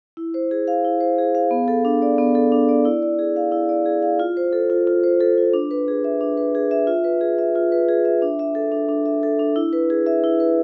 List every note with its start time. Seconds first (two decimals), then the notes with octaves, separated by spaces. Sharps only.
0.17 E4
0.34 C5
0.51 G#4
0.68 F5
0.85 E4
1.01 C5
1.18 G#4
1.35 F5
1.51 B3
1.68 A4
1.85 D4
2.02 D5
2.18 B3
2.35 A4
2.52 D4
2.69 D5
2.85 E4
3.03 D5
3.19 G#4
3.36 F5
3.52 E4
3.69 D5
3.86 G#4
4.02 F5
4.20 F4
4.37 C5
4.53 A4
4.70 F4
4.87 F4
5.04 C5
5.20 A4
5.38 F4
5.54 D4
5.71 B4
5.88 G#4
6.04 E5
6.21 D4
6.37 B4
6.55 G#4
6.71 E5
6.87 F4
7.04 B4
7.21 G#4
7.38 E5
7.56 F4
7.72 B4
7.89 G#4
8.05 E5
8.22 D4
8.39 E5
8.55 A4
8.72 D4
8.89 D4
9.06 E5
9.23 A4
9.39 D4
9.56 E4
9.73 B4
9.90 G#4
10.06 E5
10.24 E4
10.40 B4